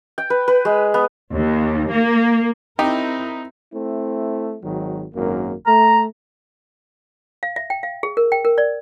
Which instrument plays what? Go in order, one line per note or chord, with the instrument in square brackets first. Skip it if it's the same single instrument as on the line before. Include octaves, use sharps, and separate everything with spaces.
[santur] G5
B4
B4
G#3
B3
[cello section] D#2
A#3
[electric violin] C4 [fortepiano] D#4 [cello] E4 A#4 [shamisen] G4
[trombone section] A3 C4 E4
G#1 D#3 F#3
G#1 F#2 A#3
[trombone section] A3 [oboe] A#5
[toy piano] F5
E5
G5
F5
G#4
A#4
G5
A#4
D5